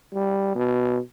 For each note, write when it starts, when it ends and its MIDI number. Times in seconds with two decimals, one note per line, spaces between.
0.14 0.51 55
0.55 0.98 47